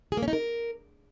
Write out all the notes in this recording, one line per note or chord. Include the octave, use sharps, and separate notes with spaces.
G#4
A#3
C#4
D#4
A#4